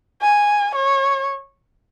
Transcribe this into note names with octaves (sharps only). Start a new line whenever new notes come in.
G#5
C#5